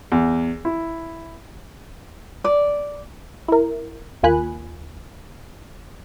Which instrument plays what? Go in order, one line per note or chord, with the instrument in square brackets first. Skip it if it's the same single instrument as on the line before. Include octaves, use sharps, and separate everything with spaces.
[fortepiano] E2
E4
[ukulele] D5
[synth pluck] E4 A#4
D#2 A#3 F4 G#5 B5 F#6